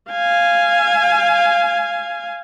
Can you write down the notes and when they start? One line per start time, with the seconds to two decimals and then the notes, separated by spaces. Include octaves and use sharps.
0.11 F5 G#5